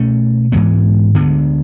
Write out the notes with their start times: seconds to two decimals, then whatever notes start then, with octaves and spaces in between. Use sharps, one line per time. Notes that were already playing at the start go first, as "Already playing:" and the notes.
Already playing: B2 A3 C#4
0.52 G#2 E3 G#3 B3
1.15 D2 D3 G#3 B3